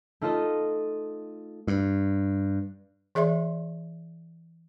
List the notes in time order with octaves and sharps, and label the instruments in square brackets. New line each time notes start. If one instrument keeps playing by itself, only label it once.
[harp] A3 D#4 F4 A4 D#5
[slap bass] G2
[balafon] E3 G#4 D5 E5 C6